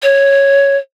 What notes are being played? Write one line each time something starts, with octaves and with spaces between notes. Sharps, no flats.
C#5